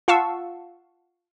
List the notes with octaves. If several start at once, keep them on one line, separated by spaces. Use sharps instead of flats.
F4 F5 F#5 A5 C#6 E6